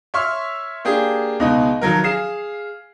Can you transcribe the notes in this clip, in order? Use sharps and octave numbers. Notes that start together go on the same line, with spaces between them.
C#5 E5 C6 C#6 F6
A#3 D4 G4 G#4
C#2 B2 G#3 D#4
D#3 F3 F#3 A#4
G#4 F5 C7 E7